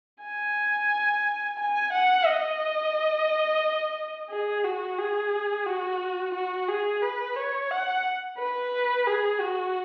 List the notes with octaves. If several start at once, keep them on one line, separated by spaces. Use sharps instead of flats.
G#5
G#5
F#5
D#5
G#4
F#4
G#4
F#4
F#4
G#4
B4
C#5
F#5
B4
G#4
F#4